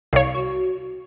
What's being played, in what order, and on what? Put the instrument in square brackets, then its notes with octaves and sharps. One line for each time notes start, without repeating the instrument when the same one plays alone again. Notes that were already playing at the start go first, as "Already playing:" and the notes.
[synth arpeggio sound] C2 C#5 [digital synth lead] F5
[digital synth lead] F#4